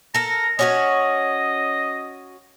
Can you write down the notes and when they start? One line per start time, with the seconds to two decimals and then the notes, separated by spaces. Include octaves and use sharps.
0.14 A4 A#4 A#5
0.59 C#4 F#4 C#5 D#5